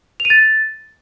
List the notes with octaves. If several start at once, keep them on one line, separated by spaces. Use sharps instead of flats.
F7
D#7
A6